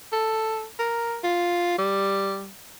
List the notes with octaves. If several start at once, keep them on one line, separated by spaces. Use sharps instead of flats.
A4
A#4
F4
G3